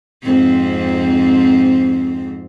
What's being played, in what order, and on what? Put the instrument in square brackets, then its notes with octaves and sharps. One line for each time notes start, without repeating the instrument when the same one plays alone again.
[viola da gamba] F2 G#2 C4